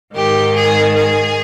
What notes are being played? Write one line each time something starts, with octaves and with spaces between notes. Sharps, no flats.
G#2 D#3 G4
G#4
G#4